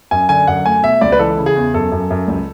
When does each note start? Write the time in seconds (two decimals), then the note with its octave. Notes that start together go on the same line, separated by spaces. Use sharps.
0.11 F#2 G#5
0.29 D3 G#5
0.47 F#2 F#5
0.65 A3 G#5
0.83 B2 E5
1.01 C#2 D5
1.12 B4
1.19 E3 A4
1.37 C#3
1.46 G#4
1.56 E2
1.74 F#2 A4
1.92 F#2
2.10 F#2
2.28 C#2